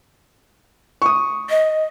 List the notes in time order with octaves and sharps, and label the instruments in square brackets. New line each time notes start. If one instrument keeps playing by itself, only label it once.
[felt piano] C#6 D#6
[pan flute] D#5